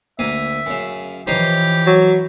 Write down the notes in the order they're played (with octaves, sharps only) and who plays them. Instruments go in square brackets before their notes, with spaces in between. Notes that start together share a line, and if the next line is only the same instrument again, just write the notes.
[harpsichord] D2 A#3 G#5 [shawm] E5
[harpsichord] F#2 C#3
[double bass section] E3 F3 [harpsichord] D#4 C5 C#5 [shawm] G4
[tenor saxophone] F#3